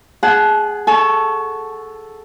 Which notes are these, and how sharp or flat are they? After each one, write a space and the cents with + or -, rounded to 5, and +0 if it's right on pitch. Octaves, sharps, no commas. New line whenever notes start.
G#4 +0 F#5 +0 A5 -30
A4 +0 G#5 +45 C#6 +0